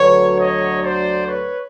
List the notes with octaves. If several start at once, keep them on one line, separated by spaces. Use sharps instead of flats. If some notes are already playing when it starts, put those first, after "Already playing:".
Already playing: D2 D3 F#3 B4 C#5
C#5 D#5
C5 D5
B4 C#5